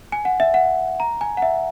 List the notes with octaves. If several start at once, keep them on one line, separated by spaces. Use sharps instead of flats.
G#5
F#5
E5
F#5
A#5
G#5
F#5
E5